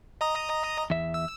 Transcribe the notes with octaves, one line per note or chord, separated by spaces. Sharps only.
D#5 A#5 D#6
E2 E5
E6